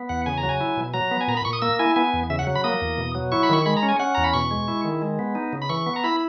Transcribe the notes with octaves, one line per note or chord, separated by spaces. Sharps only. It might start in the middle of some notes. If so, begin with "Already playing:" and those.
Already playing: B3
E2 F#5
C#3 G#5
A#5
F#3
G#5
E4
B2
F#3 A#5
B3
G#5
A#2 A#5
B5
A#2 C#6
D#6
A#3 E6
E4 G#5
B3 G#5
E2
C#3 E5
F#5
F#3
B5
A#3 D#6
E2
B2
F#3
E4 C#6
B5
D#3 C#6
G#3 B5
A#5
C#4
G#5
C#4 F#5
E2 A#5
B5
B2 C#6
G#3
E4
D#3
G#3
B3
D#4
C#3
B5
E3 C#6
B3
A#5
E4 B5